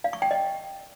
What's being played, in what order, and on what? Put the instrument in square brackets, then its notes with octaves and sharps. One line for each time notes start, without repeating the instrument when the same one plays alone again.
[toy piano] F5
C#6
G5
D#5